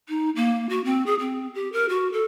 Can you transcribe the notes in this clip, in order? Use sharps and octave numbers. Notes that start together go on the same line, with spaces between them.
D#4
A#3
F#4
C4
G#4
C4
G4
A#4
F#4
A4